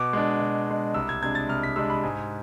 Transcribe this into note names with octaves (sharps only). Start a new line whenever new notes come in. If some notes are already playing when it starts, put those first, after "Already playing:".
Already playing: B2 D6
G#3 D4
B2
G#3 D4
C2 E6
G#6
C3 G#3 D4 G#6
A6
C2 F6
B6
C3 G#3 D4 E6
B5
G#2 G#5